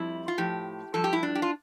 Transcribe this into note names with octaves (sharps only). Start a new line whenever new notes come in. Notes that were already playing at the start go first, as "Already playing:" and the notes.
Already playing: F2 G3 E4
F4
A2 F3 G4
G2 F3 A4
G4
E4
D4
G4
F4